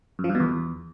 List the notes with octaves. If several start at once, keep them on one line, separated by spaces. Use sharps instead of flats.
F#2
F3
G2
B2
E2